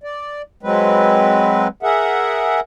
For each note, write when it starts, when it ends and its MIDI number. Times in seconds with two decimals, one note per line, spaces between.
0.03 0.42 74
0.63 1.68 54
0.63 1.68 56
0.63 1.68 60
0.63 1.68 71
1.83 2.60 68
1.83 2.60 70
1.83 2.60 76
1.83 2.60 78